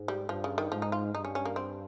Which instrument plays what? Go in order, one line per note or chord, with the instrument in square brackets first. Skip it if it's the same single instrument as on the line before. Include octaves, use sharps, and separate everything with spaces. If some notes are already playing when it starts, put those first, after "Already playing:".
Already playing: [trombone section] G#2
[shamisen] G3
[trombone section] G2 [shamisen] F3
[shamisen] C#3
D#3
[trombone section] G#2 [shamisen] F3
[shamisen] D#4
F4
[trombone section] G2 [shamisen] D#4
[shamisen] C#4
C#4
A#3
C4